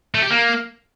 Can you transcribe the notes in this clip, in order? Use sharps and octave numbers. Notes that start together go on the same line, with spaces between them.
A3
G4
A#3